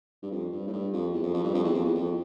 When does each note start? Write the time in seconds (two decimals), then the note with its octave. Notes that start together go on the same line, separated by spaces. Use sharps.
0.23 G2
0.31 F2
0.52 G2
0.68 A2
0.73 G2
0.93 F2
1.13 E2
1.23 F2
1.34 F2
1.44 G2
1.54 F2
1.64 E2
1.74 F2
1.85 E2
1.95 F2